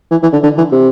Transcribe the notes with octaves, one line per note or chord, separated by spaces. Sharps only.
E3
E3
D3
D3
E3
C3